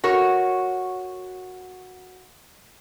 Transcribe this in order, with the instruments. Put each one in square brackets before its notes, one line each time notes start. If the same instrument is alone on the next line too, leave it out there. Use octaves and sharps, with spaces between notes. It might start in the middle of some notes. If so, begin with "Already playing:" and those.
[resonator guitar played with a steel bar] F#4 A#4 C#5